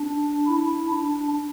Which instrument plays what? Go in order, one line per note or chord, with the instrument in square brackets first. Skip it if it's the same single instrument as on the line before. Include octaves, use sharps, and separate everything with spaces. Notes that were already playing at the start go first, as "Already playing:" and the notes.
Already playing: [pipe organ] D4
E4
D4